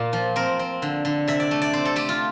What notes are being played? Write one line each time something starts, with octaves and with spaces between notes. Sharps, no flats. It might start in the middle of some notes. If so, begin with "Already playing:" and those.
Already playing: A#2 A#3
F3
C4 A#4
C4
D3
D3
C3 E5
D5
A3
D5
C4 C5
A4
A3 G4
F4